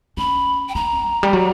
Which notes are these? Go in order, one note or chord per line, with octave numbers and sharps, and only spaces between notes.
C#4 B5
G5
D4 A#5
F#3
G3
F#3